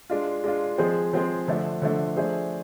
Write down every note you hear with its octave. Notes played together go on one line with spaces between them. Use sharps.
G#3 D4 F4
G#3 D4 F4
F3 G#3 C4 G#4 C5
F3 G#3 C4 G#4 C5
D3 F3 A3 D4
D3 F3 A3 D4
F3 A3 D4 G#4 C5